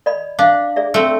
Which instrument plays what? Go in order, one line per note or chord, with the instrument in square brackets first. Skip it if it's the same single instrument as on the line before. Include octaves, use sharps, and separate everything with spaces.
[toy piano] D5 D#5 B5
[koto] D4 [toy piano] E5 F5
[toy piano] G#4 D5 E5
[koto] A3 C4